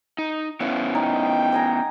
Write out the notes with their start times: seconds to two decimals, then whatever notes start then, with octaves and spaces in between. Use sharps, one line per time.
0.18 D#4
0.60 B3 C#4 E4 F5
0.95 D#4 G5
1.52 D#5 G#5 A#5